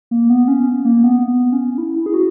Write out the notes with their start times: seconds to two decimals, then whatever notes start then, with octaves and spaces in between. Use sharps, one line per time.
0.11 A#3
0.30 B3
0.48 C#4
0.85 A#3
1.04 B3
1.28 B3
1.52 C#4
1.78 E4
2.06 G#4
2.14 F#4